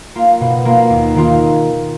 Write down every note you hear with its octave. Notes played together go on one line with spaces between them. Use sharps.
A#3 F4
B2
A#3 F4
D#2
D#3 A#3 F4